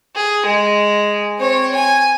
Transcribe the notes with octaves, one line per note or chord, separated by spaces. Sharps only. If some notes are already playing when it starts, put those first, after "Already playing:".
G#4
G#3
C4 C#5
G#5